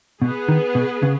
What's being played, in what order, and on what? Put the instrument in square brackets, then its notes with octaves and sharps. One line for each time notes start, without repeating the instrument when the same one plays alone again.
[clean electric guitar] B2 [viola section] B3 G#4 B4
[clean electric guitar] D#3
B2
C#3